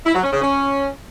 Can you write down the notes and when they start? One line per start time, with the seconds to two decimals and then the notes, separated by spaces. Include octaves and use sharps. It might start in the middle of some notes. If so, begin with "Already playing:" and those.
0.06 E4
0.15 F#3
0.24 C#4
0.33 C#3
0.42 C#4